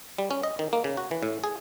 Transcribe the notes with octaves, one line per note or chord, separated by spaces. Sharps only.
G3
C#4
D#5
D#3
A#3
C#3
F#4
E3
A2
G#4